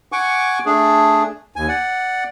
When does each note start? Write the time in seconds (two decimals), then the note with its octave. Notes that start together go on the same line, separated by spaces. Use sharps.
0.12 F#5 G#5 C#6 D6
0.66 A3 D4 G#4
1.56 D#2 G#5
1.68 D5 F#5